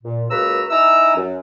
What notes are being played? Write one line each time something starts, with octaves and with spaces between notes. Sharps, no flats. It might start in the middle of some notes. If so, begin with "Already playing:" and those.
A#2
C#2 A#3 F#4 B4 A#5 E6
D#4 E4 G#5 A#5 E6
F#2 F#3 C#4